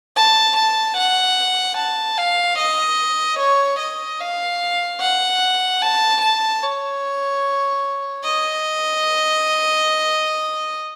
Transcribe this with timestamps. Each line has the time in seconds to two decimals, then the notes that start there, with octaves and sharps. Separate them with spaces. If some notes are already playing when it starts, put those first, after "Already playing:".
0.17 A5
0.57 A5
0.97 F#5
1.78 A5
2.18 F5
2.59 D#5
3.39 C#5
3.79 D#5
4.21 F5
5.00 F#5
5.82 A5
6.22 A5
6.63 C#5
8.25 D#5